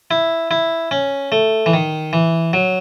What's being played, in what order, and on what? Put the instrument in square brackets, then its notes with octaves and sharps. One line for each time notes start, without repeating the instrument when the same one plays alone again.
[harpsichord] E4
E4
C#4
A3
E3
D#3
E3
F#3